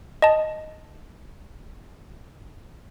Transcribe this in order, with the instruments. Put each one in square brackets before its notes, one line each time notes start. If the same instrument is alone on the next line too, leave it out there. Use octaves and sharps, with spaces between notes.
[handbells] D#5 A5